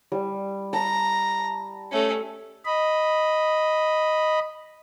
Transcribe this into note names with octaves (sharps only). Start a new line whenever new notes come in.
G3
A5 A#5
A3 C#4
D#5 B5